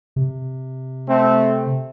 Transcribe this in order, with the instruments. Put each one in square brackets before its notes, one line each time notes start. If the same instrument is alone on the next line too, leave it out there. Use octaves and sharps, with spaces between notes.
[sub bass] C3
[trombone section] A3 C4